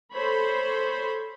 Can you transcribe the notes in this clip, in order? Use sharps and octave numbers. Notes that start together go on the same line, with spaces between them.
A4 C5 C#5 B5